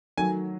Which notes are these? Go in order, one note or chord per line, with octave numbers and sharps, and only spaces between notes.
D#3 F#3 A3 G#5